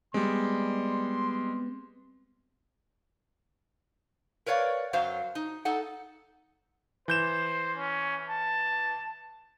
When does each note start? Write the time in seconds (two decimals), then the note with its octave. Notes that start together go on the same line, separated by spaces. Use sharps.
0.14 G3 G#3 B3 C4 C6
4.46 A#4 B4 C#5 D5 F5
4.93 F#2 F#3 C5 F5
5.35 D#4
5.65 D#4 A4 F#5
7.08 E3 C5 G6 E7
7.77 C#4
8.29 A5